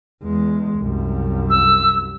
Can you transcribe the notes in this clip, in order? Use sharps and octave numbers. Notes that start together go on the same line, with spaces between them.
E2 G#3
C2 F#2
E6